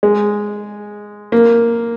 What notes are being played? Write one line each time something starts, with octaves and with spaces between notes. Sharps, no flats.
G#3
A#3